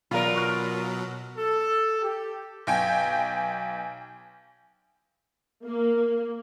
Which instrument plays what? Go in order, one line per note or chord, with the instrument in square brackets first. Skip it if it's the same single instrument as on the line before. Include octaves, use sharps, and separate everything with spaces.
[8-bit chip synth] B2 F#3 [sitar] F4 A#4 [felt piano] D5 F5 B5
[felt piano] C#6 F6 D7
[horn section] A4
G4
[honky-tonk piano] B1 G5 G#5
[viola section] A#3